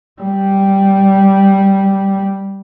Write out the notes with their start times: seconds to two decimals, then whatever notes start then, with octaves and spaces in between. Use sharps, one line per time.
0.21 G3